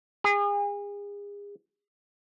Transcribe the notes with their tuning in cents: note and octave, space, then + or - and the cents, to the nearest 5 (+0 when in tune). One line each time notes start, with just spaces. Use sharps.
G#4 -35